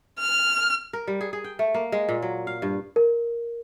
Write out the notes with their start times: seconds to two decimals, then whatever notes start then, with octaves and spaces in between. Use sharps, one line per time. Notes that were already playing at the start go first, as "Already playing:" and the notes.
0.19 F6
0.93 A#4
1.07 G3
1.21 G#4
1.33 G#4
1.44 G5
1.59 A3
1.74 A#3
1.92 G#3
2.09 A#2
2.22 F#3
2.47 F5
2.62 G2
2.96 A#4